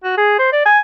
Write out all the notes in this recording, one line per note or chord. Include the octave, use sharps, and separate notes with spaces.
F#4
G#4
C5
D5
G#5